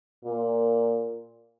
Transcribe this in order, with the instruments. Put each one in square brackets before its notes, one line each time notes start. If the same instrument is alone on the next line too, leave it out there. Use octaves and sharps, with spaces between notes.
[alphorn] A#2